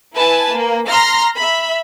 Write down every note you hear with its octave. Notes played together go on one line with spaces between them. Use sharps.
E4 B4 G#5 A5
A#3
A#5 C6 F6 A#6
E5 B5